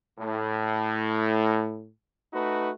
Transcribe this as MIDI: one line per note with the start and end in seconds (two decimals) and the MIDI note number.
0.19 1.89 45
2.33 2.71 57
2.33 2.71 63
2.33 2.71 66
2.33 2.71 71